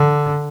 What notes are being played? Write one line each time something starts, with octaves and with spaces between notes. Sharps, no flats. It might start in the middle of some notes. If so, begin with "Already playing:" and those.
Already playing: D3